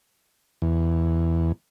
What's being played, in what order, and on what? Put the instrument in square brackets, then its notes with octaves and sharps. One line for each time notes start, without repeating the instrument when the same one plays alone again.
[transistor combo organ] E2